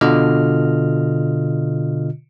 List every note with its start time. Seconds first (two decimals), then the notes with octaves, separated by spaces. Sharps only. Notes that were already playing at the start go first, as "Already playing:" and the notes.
0.01 B2 D3 F4 D#5 F6